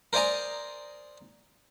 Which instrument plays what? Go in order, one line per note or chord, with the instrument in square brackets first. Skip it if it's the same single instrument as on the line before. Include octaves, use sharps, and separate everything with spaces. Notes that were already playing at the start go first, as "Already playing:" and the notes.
[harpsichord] A#4 C5 D5 D#5 G#5 A#5